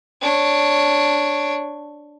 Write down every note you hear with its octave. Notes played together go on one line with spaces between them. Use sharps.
D4 C#5